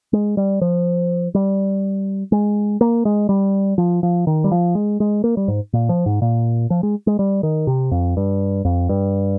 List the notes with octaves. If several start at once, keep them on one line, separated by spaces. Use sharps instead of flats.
G#3
G3
F3
G3
G#3
A#3
G#3
G3
F3
F3
D#3
G3
F3
G#3
G#3
A#3
G3
G#2
A#2
F3
G#2
A#2
F3
G#3
G#3
G3
D#3
C3
F2
G2
F2
G2